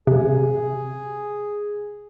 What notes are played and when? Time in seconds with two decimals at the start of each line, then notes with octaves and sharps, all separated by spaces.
0.07 C3 G#4